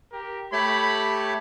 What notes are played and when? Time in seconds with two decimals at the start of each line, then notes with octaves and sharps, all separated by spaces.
0.12 G4 A#4
0.53 A3 G4 C#5 B5